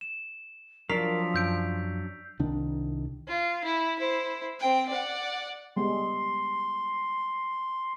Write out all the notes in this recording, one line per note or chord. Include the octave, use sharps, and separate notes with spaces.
E7
F3 F#3 D4 A#4 D5 B6 C7 F7
F#2 E6 G6 D7
C2 D#3 D4
F4
E4
E4 C5
C4 G5
D5 F#5
G3 G#3 B3 C6